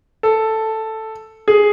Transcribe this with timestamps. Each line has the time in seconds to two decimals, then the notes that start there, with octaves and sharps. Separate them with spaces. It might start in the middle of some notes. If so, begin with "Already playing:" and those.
0.23 A4
1.48 G#4